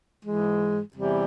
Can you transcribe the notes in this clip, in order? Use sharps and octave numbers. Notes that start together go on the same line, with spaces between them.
G#2 E3 G#3
E2 C3 E3 G3